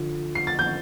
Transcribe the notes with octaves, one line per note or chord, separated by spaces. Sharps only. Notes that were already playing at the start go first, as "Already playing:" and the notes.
Already playing: D3 F3 F4
C7
A6
G6